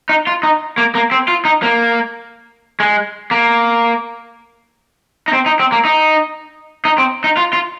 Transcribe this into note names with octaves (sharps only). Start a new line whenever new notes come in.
D#4
F4
D#4
A#3
A#3
C4
F4
D#4
A#3
G#3
A#3
D#4
C4
D#4
C4
A#3
D#4
D#4
C4
D#4
F4
F4